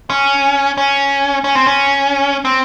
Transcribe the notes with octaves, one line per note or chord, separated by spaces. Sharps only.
C#4
C#4
C#4
C4
C#4
C4